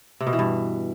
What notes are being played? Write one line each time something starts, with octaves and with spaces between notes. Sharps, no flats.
C3
B2
E3
G2